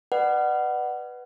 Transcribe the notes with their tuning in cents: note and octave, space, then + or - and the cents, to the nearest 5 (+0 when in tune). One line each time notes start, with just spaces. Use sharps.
B4 +0 D5 +35 F#5 +15